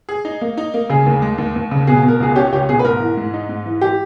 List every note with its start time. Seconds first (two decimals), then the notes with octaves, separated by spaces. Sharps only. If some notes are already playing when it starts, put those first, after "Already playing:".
0.09 G#4
0.25 D#4
0.41 A#3
0.57 D#4
0.74 A#3
0.90 C#3 G#4
1.06 D#2
1.22 G#3
1.38 D#2
1.56 D#2
1.71 C#3
1.87 B2 G#4
2.03 B2
2.08 A#4
2.20 C#2 G#4
2.36 C#4 G4
2.52 C#2 G4
2.69 B2 G#4
2.79 B4
2.84 G#2 A#4
3.00 E3
3.17 G#2
3.34 D#4
3.49 G#2
3.66 E3
3.81 E3 G4